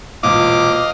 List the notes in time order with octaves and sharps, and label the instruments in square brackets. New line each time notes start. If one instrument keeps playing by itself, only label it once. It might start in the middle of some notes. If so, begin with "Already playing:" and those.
[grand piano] E1 A#2 [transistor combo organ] D#5 F5 [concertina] D6